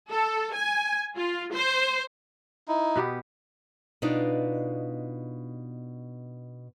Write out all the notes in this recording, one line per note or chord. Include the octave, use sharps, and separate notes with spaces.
A4
G#5
F4
C5
D#4 E4
B2 B3 G4
B2 B3 D4 D#4 F4